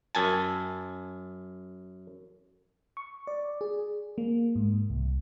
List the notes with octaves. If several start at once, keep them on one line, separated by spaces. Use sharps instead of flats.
F#2 G#5 A5
C#6
D5
G#4
A#3
G#2
C2